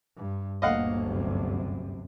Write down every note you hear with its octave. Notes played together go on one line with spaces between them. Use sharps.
G2
G1 D2 A#2 A#3 D#5 F5 F#5
F#2 C3